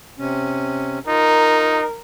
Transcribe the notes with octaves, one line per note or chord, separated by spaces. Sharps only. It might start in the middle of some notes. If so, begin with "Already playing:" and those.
C3 C#4
D#4 F4 A#4